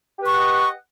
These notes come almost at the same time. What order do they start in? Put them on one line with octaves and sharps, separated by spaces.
G4 B4 C#6 F#5 D#5